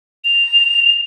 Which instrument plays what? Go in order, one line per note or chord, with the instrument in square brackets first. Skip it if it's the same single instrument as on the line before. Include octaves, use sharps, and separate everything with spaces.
[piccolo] F7